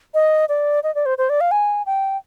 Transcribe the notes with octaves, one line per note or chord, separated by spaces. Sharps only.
D#5
D5
D#5
D5
C5
C5
D5
F5
G#5
G5